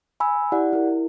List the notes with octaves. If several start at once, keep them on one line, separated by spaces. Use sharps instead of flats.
G#5 B5 E6
E4 G4 D5 F#5
E4 A#4